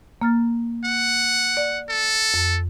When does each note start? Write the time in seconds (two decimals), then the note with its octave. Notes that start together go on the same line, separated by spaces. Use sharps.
0.22 A#3 F6 A6
0.85 F#5
1.57 D5
1.89 A4
2.34 F2